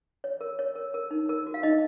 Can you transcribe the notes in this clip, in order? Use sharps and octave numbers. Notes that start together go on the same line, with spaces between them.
C#5
A#4
C#5
A#4
A#4
D#4
A#4
F#4
F5
D#4 D#5